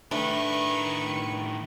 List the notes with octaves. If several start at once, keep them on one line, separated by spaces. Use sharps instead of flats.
A2 D#3 A3 D4 B4 C#6